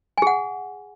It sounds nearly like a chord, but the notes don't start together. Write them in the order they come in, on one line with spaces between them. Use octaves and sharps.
G#5 G#4 F#5